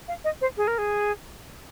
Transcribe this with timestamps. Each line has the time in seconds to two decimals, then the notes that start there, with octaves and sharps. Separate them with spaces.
0.08 F5
0.24 D#5
0.41 C5
0.57 G#4
0.67 A#4
0.78 G#4